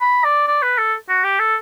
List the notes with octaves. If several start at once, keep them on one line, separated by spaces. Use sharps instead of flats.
B5
D5
D5
B4
A4
F#4
G4
A4